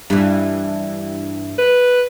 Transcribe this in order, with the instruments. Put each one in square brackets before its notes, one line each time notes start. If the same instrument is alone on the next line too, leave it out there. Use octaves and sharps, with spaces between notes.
[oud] G2 E3 [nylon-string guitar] G3 D4
[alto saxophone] B4